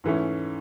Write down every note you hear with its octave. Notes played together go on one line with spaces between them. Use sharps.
G#2 E3 A3 C#4 E4